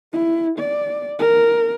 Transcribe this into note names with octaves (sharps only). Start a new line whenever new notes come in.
E4
D5
A#4